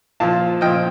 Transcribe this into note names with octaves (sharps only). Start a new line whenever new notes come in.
A#2 F3 F5 A5
A#2 F3 D#5 G5